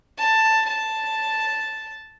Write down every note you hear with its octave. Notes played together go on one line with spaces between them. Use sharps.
A5
A5